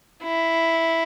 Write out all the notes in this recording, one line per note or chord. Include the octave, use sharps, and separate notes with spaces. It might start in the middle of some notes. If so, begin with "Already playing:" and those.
E4